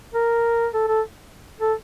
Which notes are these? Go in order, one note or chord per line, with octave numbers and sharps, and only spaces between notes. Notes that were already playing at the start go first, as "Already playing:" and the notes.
A#4
A4
A4
A4